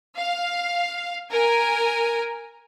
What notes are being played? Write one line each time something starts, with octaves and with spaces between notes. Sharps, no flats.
F5
A#4 G#5